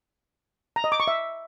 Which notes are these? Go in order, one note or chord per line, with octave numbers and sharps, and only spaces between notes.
A#5
D#5
D6
C#6
E5